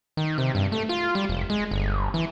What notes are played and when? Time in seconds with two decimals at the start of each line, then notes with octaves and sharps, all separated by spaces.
0.17 D#3
0.38 C3
0.55 G2
0.72 A3
0.89 F4
1.15 G3
1.29 F1
1.50 G#3
1.71 G1
2.14 E3